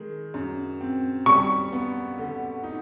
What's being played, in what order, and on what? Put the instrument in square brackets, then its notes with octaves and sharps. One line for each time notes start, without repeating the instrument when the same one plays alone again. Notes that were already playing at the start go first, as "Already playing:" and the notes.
Already playing: [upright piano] D#3 G#3
F#2
C4
[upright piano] G3 [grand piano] C#6
[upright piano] B3
D3
D#4